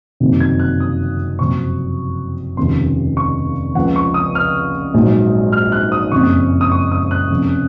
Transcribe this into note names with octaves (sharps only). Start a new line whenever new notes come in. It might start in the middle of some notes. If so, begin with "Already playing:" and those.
F#1 F2 C3 D#3 F#3
G#6
F#6
D#6
F#1 F2 C3 F#3 C#6
F1 D#2 C#3 F3 C6
C#6
C#2 C#3 F3 F#5
C#6
D#6
F6
A#1 G#2 F#3
F6
F#6
D#6
F#1 F2 C#3 C#6
D#6
C#6
D#6
F#6
F1 F2 C#3 F3